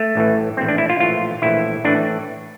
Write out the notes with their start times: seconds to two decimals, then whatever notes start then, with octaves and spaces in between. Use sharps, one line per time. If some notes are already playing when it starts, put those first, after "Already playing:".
Already playing: A3
0.15 A1 A2 E3
0.57 A#1 A2 E3 C4
0.68 D4
0.78 E4
0.89 F4
1.00 A#1 A2 E3 F4
1.42 A#1 A2 E3 E4
1.85 A2 E3 D4